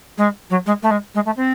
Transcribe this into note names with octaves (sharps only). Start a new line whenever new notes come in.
G#3
F#3
G#3
A3
G#3
G#3
A3
C4